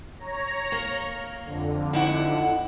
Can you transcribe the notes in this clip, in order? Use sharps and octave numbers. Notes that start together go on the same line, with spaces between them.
C#5 A#5
A#3
F2 D3
D#3 E4 F#5